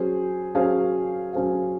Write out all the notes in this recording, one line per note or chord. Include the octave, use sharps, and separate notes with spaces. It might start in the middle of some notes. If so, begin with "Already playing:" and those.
Already playing: F#3 C#4 G#4 C5
F#3 C#4 G#4 C5 F5
F#3 C#4 G#4 C5 F5